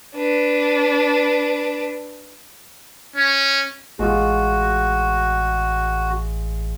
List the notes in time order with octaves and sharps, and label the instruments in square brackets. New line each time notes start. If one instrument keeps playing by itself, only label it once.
[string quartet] D4 B4
[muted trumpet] C#4
[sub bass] A1 [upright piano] G#3 F4 [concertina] F#4